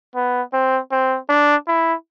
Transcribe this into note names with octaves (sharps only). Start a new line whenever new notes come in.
B3
C4
C4
D4
E4